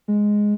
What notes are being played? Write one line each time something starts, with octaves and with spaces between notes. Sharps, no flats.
G#3